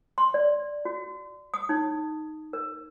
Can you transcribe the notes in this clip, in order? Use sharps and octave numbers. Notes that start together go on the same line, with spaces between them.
C6
D5
F#4
D#6
D#4
A#4